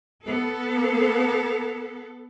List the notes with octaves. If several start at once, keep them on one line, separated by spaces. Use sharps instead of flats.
B3 A4